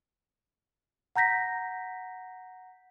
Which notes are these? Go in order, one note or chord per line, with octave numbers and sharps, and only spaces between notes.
F#5 A#5 G6 A#6 B6